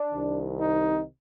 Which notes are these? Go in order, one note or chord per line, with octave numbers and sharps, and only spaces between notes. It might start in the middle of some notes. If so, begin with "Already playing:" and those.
Already playing: D4
C2 C3 D#3
D#4